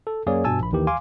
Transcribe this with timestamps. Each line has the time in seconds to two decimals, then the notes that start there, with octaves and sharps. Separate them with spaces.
0.07 A4
0.27 F#2 A#3 G#4 C#5 D5
0.45 G2 B2 G#5 A5 E6
0.60 A#1 B5
0.72 D#2 D#3 E3 G4
0.87 F5 G#5 C6 D6